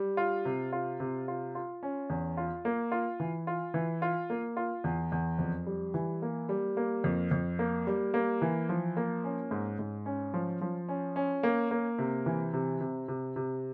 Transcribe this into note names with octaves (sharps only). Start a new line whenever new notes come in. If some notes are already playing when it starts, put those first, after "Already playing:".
Already playing: G3
F4
C3
F4
C3
F4
F4
C#4
E2
F4
A#3
F4
E3
F4
E3
F4
A#3
F4
E2
E2
F2
G3
E3
A#3
G3
A#3
F2
F2
A#3
G3
A#3
E3
F3
A#3
C#4
G#2
G#2
C#4
F3
F3
C#4
C#4
A#3
A#3
C3
E3
C3
C3
C3
C3